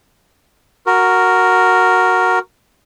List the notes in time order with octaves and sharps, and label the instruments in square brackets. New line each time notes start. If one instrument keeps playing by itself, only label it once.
[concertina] F#4 A#4